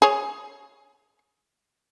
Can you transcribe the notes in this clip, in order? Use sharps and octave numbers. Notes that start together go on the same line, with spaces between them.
G#4 C#5